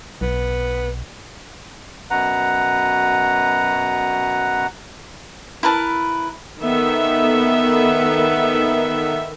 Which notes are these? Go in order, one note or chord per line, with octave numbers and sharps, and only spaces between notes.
B1 B3
F#2 B2 B4 F#5 A#5
E4 A#4 B4 A5
D#3 B3 A4 E5